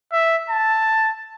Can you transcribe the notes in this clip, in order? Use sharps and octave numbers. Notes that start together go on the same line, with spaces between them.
E5
A5